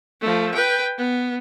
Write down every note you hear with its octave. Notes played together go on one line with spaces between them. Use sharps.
F3 A3
B4 G5
B3